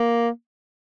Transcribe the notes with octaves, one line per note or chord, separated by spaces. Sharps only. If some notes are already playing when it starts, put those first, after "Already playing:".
Already playing: A#3